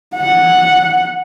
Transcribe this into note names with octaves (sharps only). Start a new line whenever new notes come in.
F#5